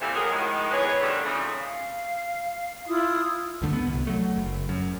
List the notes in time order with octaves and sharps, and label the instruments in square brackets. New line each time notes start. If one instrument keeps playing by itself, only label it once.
[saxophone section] C3 E3 G3 A3 A#3 C4
F#3 G#4 A#4
A2 D#3 F3 G#3
E2 G#3 G#4 B4 C#5
D3 D#3 G3 A3 D4 D#4
C#3 E3 F3 A3 C4 D#4
[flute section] F5
E4 F4 D#6
[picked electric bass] D2 G2 D3 A3
B3
C2
F#3 A3
F#1
F#2